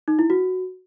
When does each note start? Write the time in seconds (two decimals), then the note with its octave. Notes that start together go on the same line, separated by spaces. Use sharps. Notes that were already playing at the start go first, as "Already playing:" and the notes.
0.08 D#4
0.19 E4
0.30 F#4